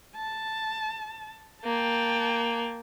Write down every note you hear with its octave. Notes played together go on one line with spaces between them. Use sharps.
A5
A#3 G5 A5